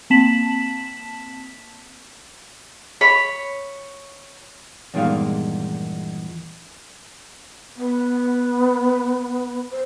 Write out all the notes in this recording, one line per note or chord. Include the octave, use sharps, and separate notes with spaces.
A#3 C4 A5 B6 E7 F#7
C#5 B5
E2 G2 A#2 D#3 G#3 F5
B3
C5